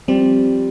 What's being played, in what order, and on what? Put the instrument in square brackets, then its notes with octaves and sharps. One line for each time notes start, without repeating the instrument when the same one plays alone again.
[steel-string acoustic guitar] F3 G3 [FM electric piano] C4